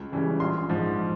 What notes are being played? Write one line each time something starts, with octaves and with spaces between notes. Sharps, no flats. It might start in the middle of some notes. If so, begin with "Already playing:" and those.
Already playing: C#2
C#3 E3 G3
A#1 C6
G#2 F3